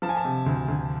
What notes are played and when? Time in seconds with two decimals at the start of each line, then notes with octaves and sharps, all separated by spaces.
0.02 F3 A5
0.09 G#5
0.17 A5
0.25 C3
0.46 D2
0.68 D2